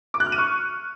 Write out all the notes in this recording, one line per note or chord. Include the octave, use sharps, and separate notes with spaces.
D6
F#6
F6
D#7
C#6